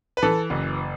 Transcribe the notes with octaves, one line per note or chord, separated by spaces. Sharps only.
B4
E3 A4
F#1